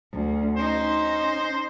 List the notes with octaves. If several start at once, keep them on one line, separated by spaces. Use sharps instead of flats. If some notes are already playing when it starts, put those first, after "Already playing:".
D2
C#4 D#4 C5